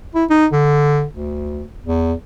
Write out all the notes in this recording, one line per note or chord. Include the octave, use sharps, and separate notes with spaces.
E4
D#4
D3
D2
E2